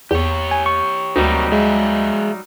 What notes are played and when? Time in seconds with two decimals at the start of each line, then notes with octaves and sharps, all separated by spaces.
0.11 E2 G4 C#5
0.51 G#5
0.66 C#6
1.16 D2 C3 F#3 G3 A#3 D#4 G4
1.52 G#3 G#4 E5 F5